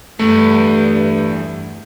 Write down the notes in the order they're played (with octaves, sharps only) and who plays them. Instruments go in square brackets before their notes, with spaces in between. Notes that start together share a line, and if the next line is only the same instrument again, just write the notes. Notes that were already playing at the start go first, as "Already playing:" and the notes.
[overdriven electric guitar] E2 [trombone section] G2 [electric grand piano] A3